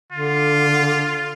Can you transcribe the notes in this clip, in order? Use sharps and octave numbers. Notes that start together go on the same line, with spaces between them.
D3 F4